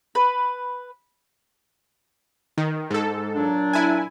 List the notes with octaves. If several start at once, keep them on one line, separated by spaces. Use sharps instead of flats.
B4
D#3
G#2 A4
A#2 F#3 D4
E4 G#5